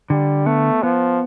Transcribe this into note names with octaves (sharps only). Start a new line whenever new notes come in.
D3 G3
A3 B3
F3 B3